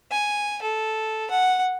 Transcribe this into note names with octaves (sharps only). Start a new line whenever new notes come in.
G#5
A4
F#5